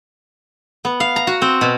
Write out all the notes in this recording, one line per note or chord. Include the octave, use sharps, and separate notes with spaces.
B3
F5
A#5
F#4
C4
B2